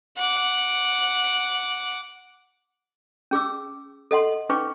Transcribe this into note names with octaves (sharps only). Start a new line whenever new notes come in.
F#5 D6
C#4 G#4 D6 E6
A4 D#5 F#5 C6
C#4 D#4 B4 G5 C#6 D6